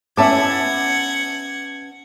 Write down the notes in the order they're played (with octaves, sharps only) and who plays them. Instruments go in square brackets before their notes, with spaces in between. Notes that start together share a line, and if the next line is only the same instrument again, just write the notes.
[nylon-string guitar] B3 C#4 [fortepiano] E5 A5 D6 [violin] F#5 G#6